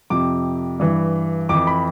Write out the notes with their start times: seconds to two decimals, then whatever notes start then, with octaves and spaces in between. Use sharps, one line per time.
0.10 F2 C3 F3 D6
0.80 G2 E3
1.49 F2 E3 D6
1.67 B5